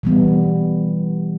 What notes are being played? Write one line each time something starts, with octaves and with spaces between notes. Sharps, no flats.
E3 G3 B3